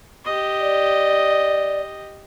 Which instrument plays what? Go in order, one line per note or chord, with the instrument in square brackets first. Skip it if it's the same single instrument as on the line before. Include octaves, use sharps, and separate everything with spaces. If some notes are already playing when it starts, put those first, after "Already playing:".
[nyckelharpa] G4 D#5
[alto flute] D5